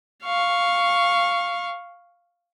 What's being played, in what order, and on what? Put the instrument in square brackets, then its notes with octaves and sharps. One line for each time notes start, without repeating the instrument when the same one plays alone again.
[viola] F5 C#6